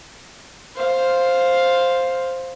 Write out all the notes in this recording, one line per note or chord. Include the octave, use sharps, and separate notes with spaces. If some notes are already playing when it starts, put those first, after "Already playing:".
C5 F5